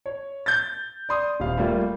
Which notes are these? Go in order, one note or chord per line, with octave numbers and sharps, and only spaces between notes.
C#5
G6 A6
D5 C6 D#6
D#1 F5
G3 A3 A#3 F4